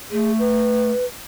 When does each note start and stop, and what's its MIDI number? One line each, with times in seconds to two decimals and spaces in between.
0.11 0.90 57
0.11 0.32 68
0.39 1.05 71